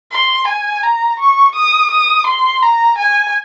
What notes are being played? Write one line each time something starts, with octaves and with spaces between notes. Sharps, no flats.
C6
G#5
A#5
C#6
D#6
D#6
C6
A#5
G#5